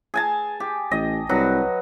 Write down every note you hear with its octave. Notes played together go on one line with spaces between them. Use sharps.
G#4 G#5 A5
G4
A1 D#5
C2 F#3 B4